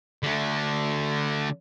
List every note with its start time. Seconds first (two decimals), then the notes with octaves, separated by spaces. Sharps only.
0.23 D3 A3